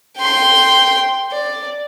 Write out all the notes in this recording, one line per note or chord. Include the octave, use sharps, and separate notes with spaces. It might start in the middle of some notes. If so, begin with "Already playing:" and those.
G5 C6
D5